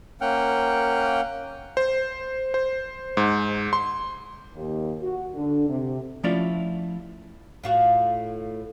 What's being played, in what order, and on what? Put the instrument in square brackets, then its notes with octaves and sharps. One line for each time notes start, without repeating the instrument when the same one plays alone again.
[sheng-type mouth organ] A#3 C#4 F#5 G5 F6
[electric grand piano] C5
C5
G#2
C6
[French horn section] D#2
F#4
D3
C3
[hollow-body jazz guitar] F3 A3 C#4 E4 F4 D5
[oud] A2 F4 F#4